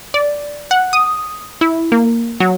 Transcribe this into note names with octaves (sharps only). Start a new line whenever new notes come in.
D5
F#5
D#6
E4
A#3
F#3